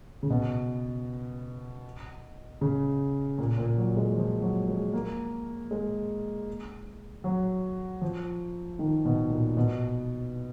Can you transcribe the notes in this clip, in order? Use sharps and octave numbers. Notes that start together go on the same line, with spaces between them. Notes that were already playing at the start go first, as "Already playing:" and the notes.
C#3
B2
C#3
A#2
A#2
F#3
G#3
F3
F#3
G#3
A#3
G#3
F#3
F3
D#3
B2
A#2
B2